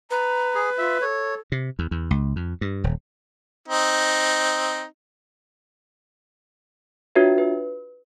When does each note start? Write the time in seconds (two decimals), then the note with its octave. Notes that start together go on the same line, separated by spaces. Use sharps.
0.11 B4 A#5
0.55 G#4
0.78 F4 E5
1.02 A4 C#5
1.52 C3
1.79 E2
1.91 E2
2.11 C#2
2.36 F2
2.61 G2
2.84 D#1
3.68 C4 D#4
7.15 D4 F4 F#4 B4 C#5 E5
7.38 B4